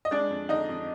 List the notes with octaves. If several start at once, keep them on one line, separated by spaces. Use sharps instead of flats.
D#5
G#3 D4 D5
F2
D3 D#4 D#5
F2